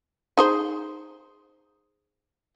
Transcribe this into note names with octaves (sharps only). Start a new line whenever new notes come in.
D#4 G#4 C5